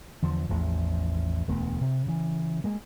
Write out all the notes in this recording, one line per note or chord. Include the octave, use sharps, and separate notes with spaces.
E2 D3 F3
A1 E2 F3
E1 D2 A3 B3
C3
C#3 E3
G#3 A#3